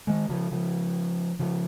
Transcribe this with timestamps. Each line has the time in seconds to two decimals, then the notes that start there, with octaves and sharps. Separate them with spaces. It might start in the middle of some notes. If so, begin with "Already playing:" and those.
0.07 D#3 G#3
0.29 C#3 F3
0.51 C#3 F3
1.39 C#3 F3